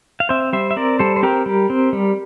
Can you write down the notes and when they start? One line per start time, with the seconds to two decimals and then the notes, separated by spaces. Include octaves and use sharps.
0.20 F5
0.29 C4 C5 E5
0.53 G3 C5 E5
0.71 E5
0.76 C4 A#4 D5
0.99 G3 A4 C5
1.16 C5
1.23 C4 G4 A#4
1.46 G3
1.70 C4
1.93 G3